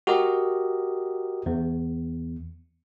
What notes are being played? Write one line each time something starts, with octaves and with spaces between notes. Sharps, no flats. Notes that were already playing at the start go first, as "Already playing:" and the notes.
F#4 G4 A#4 D#5
E2